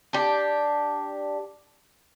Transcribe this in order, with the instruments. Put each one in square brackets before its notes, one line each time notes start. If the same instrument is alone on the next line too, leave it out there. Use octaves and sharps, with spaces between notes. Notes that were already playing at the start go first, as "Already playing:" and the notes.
[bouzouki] D4 G4